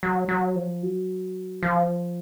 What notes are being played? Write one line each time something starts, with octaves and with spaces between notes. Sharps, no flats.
F#3
F#3
F3
F#3
F3